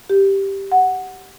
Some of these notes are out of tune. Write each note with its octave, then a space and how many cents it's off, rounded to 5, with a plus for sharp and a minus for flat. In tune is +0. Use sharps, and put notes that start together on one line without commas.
G4 +0
F#5 +0